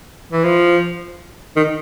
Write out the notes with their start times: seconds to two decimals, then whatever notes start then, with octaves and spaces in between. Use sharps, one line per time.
0.32 E3
0.44 F3
1.56 D#3